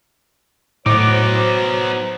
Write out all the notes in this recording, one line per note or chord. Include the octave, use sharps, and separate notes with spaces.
A2 F#3 B3 D#4 C5 D6